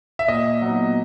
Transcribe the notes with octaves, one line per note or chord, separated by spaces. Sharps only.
E5
A#2 D#5
F#3 B3 D#4